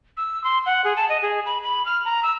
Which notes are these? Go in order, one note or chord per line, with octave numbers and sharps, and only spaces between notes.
E6
C6
F#5
G#4
A5
D#5
G#4
B5
B5
F6
A#5
E6